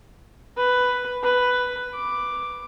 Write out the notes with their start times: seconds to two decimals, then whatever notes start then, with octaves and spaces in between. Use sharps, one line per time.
0.57 B4
1.23 B4
1.94 D6